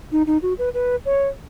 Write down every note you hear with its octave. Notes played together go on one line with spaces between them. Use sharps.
D#4
D#4
F#4
B4
B4
C#5